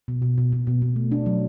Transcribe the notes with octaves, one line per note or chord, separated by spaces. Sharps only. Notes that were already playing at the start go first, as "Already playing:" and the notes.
B2
B2
B2
B2
B2
B2
A3
D4
F#3